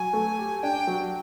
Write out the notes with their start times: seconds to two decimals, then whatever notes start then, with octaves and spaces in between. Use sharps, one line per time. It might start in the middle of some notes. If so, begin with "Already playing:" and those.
Already playing: F#3 G#5
0.13 A3
0.38 G4
0.63 D4 G5
0.87 F#3